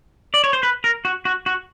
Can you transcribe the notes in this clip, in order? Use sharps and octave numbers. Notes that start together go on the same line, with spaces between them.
D5
C#5
C5
B4
A#4
F#4
F#4
F#4